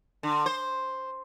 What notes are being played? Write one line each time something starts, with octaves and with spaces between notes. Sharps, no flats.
D3
C5